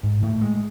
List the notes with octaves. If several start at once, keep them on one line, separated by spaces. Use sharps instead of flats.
G#2
A2
G#3